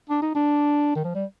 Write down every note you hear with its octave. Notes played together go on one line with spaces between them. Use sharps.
D4
D#4
D4
D#3
F3
G3